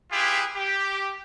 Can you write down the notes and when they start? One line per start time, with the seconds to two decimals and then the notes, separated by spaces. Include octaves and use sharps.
0.11 E4 F4 G4 G#4 B4
0.55 G4